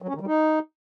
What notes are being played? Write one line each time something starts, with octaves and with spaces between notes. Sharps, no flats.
F#3
C#4
D#3
G3
D#4